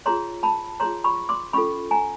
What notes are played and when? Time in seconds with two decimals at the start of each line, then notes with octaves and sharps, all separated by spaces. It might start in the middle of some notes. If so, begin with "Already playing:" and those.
0.06 F4 G#4 C#5 A#5 C6
0.43 A5 B5
0.80 F4 G#4 C#5 A#5 C6
1.04 B5 C#6
1.29 C6 D6
1.53 C#4 F4 A4 B5 C#6
1.91 G#5 A#5